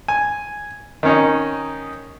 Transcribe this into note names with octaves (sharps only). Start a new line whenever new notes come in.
G#5
D#3 C#4 D#4